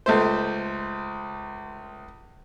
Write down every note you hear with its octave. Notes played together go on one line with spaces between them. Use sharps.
C#2 A3 C5